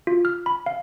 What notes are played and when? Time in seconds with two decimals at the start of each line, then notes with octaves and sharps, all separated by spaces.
0.07 F4
0.25 F6
0.46 B5
0.66 F5